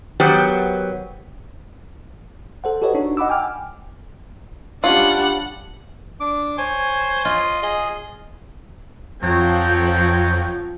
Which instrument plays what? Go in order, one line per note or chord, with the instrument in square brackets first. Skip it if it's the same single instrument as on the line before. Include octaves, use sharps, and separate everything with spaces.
[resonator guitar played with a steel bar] D#3 F#3 B3 G4 C5
[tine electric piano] A4 C5 F#5
F#4 G4 A4 B4 C#5 D#5
D4 D#4 F#4
D#5 F#5 B5 D6 E6
G5 G#5 D6 F6
[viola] G3 D4 [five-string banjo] C#4 F4 [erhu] F#5
[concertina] D4 D6
[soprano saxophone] C5 [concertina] C#5 G#5
[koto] F4 [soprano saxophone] D#5
[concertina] G#4 [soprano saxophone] D#5
[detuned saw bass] F2 [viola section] F3 [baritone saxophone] F#3 [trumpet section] G5